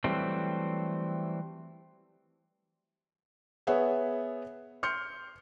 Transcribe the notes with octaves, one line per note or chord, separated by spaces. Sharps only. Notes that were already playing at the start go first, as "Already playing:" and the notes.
E3 F#3 G3 A3 C4
B3 G#4 C#5 E5 F#5
C6 F6 G6 C#7